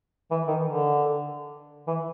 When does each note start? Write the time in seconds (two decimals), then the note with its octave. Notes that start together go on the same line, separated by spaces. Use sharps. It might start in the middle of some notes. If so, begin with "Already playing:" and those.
0.31 E3
0.48 D#3
0.66 D3
1.87 E3